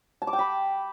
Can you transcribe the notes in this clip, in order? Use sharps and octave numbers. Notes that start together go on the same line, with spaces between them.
A5
D6
G5
B5